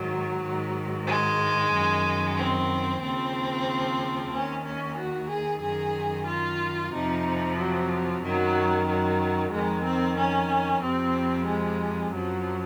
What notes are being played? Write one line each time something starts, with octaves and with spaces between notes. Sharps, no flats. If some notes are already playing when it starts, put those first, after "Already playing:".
Already playing: G#2 D#3 F#3
G#2 D#3
G#3
F#2 D#3
C4
D#2 C#3 F3 C4
D#2 D#3 C#4
C#4
F#4
G#4
F#2 D#3 G#4
F4
F2 C3 F3 D#4
F#3
F#2 D#3 F#3
F#3
F2 D#3 G#3
C4
C#4
F2 C3 F3 C4
G#3
F#2 F3 F#3